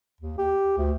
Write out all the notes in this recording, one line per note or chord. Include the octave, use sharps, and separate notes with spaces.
D#2
G4
D2